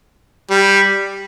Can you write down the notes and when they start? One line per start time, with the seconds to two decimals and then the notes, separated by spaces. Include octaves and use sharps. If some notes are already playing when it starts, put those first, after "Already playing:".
0.50 G3